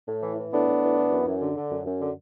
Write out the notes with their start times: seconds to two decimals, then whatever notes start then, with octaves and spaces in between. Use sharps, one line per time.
0.08 A2
0.22 E3
0.37 E3
0.52 A2 B3 D4
0.67 A2
0.82 E3
0.97 E3
1.11 F#2
1.26 F#2
1.41 D3
1.56 D3
1.71 F#2
1.85 F#2
2.00 D3